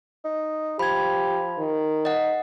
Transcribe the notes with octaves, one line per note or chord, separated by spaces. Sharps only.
D#4
F3 G4 B5 G#6
D#3
D#4 D#5 F#5